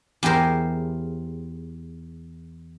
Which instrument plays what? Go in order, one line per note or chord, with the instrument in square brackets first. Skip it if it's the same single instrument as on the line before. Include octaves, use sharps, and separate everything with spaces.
[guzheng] E2 G4 G#4 A#4 C5